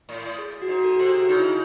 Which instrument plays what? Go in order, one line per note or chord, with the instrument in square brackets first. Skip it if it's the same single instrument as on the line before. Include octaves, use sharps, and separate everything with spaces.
[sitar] A2
[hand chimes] G#4
F#4
[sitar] G#2
[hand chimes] F#4 A4
[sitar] C3
[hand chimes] F#4
[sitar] C#3 [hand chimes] D#4
[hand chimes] E4
D#4